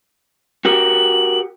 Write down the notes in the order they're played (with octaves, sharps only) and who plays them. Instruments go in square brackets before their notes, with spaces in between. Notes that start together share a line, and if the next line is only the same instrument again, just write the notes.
[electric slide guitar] F#4 G4 A#4 [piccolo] F#7